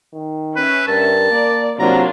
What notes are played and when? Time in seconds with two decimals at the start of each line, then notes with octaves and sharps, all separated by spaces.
0.14 D#3
0.56 C#4 B4 E5
0.88 G2 A#4 A5
1.31 A#3 D5
1.79 C3 F#3 A#3 D4 F4 A#5